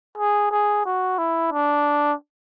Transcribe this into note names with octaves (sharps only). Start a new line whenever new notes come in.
G#4
G#4
F#4
E4
D4